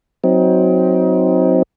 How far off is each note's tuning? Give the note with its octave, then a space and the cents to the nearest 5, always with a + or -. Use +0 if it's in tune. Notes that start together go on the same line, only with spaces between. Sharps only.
F#3 +0 C4 +0 D#4 +30